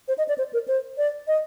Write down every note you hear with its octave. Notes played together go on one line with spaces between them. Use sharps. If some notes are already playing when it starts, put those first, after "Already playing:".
C5
D#5
D5
C5
A#4
C5
D5
D#5